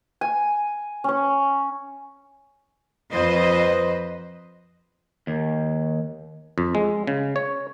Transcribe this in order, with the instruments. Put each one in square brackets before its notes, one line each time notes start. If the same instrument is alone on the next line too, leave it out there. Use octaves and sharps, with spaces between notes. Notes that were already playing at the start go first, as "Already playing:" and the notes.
[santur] G#5
C#4 C#5
[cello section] F2 B4 C5 D#5
[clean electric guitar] D#2
[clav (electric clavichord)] F2
G#3
C#3
C#5